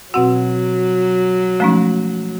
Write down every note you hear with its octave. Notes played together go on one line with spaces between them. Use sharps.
B2 F#3 C4 F#4 F#5
F3 G#3 A3 C#4 D#4